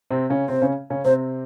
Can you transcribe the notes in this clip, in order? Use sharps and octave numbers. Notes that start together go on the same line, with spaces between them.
C3 C4
C#3 C#4
C3 C4 C5
C#3 C#4
C#3 C#4
C3 C4 C5